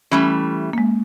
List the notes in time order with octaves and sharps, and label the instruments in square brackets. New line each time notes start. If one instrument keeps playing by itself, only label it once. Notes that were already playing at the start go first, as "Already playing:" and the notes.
[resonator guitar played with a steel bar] E3 G3 A3 [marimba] C#4 B5
[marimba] G#3 A#3